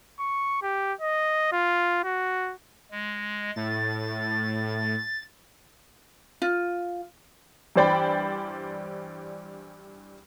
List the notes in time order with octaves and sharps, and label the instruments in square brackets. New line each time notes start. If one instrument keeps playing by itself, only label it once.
[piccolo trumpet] C#6
G4
D#5
F4
F#4
[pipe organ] G#3
[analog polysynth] A2 [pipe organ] A6
[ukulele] F4
[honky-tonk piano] G2 E3 C5 D5 G5 B5